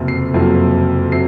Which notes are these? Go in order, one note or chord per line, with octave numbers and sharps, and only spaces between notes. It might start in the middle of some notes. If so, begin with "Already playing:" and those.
Already playing: F#1 F2 C3 F#3 A#3
C7
F#1 F2 C3 F#3 A#3
C3 F#3 C7